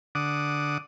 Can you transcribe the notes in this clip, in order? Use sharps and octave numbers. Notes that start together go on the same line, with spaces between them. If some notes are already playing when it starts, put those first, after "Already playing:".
D3 F#5 D6 D#6